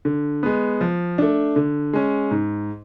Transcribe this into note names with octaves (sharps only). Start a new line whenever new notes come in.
D3
G#3 B3
F3
A3 D4
D3
G#3 C#4
G#2